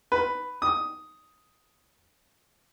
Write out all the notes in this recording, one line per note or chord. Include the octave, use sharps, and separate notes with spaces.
B4
D#6